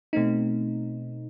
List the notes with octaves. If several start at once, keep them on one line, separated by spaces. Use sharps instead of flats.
B2 A3 C4 D#4